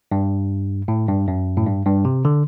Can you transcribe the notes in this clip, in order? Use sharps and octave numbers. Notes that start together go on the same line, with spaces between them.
G2
A2
G2
F#2
A2
G2
G2
C3
D3